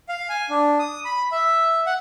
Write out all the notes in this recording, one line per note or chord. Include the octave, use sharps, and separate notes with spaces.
F5
G#5
D4
D#6
B5
E5
F#5